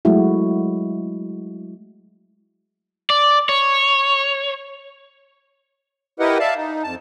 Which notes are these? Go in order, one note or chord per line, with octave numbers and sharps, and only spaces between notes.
F#3 G#3 A3 E4 F#4
D5
C#5
E4 G4 A#4 B4 D#5 F#5
D5 E5 F5 A5
D#4
F2 A5